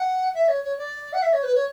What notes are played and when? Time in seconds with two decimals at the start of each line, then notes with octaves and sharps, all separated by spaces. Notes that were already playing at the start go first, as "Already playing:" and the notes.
Already playing: F#5
0.34 E5
0.48 C#5
0.64 C#5
0.78 D5
1.13 F#5
1.22 E5
1.33 C#5
1.43 B4
1.55 C#5